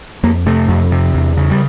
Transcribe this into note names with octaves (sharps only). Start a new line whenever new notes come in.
F2 A#3
C3 A3
F2
C3
E2
C#3
G3